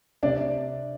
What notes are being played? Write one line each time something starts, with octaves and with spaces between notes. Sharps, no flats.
C3 D4 D5